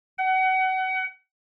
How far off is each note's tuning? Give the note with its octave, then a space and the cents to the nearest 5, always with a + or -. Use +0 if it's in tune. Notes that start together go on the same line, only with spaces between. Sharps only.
F#5 +30